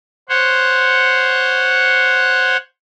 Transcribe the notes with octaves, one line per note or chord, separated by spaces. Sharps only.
C5 C#5 F#5